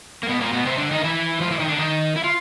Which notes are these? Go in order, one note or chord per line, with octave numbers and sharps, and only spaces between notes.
A#3
B2 B3
A#2 A#3
B2 B3
C3 C4
D3 D4
D#3 D#4
E3 E4
F3 F4
E3 E4
D#3 D#4
D3 D4
D#3 D#4
E4
F4